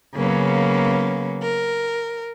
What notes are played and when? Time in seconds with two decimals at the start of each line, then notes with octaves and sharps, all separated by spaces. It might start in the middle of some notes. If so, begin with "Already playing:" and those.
0.16 C#3 F#3 A#3 B3 C#4
1.40 A#4